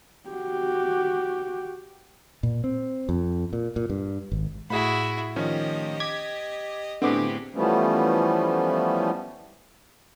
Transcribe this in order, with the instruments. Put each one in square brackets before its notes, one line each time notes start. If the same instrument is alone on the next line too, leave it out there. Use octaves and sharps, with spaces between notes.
[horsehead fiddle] F#4 G4
[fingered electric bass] A#2
C4
F2
A#2
A#2
G2
G#1
[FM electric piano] A2 [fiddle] E4 F#4 [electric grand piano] G#4 B5
[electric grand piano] D#3 F3 C#4 [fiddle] G4 D#5
[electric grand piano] D6 [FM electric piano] G#6 B6
[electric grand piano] A2 C4 [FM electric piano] D3 B3 D6 [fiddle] G4 G#4
[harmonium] E3 F3 G3 A3 B3 C#4